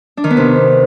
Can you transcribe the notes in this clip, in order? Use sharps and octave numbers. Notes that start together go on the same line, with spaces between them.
D4
D#3
B3
C3